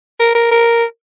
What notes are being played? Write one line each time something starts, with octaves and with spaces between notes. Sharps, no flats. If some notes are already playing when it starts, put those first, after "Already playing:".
A#4
A#4
A#4